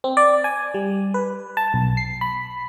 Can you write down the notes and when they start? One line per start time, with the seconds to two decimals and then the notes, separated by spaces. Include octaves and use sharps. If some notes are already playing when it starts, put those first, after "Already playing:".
0.04 C4
0.17 D5
0.44 G#5
0.74 G3
1.14 B4
1.57 A5
1.74 B1
1.97 C7
2.21 B5